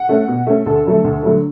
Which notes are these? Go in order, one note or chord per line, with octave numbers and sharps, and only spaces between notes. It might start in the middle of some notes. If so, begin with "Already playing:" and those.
Already playing: F#5
A3 C#4
B2
A3 C#4
D2 A4
D3 F#3 A3
D2
D3 F#3 A3